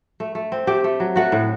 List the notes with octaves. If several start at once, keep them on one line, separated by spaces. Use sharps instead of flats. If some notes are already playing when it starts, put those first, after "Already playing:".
A3
A3
C4
A3 G4 G5
A3
F#3
A3 F#4 F#5
A2